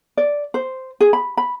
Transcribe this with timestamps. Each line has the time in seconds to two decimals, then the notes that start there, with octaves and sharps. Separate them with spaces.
0.17 D5
0.54 C5
1.00 G#4
1.13 B5
1.37 B5